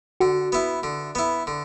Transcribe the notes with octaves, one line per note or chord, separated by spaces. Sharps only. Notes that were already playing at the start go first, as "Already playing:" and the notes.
D3 F#4
B3 E4
D3
B3 E4
D3